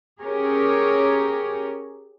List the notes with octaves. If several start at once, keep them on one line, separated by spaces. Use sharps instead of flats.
C#4 G4 G#4 A#4 C#5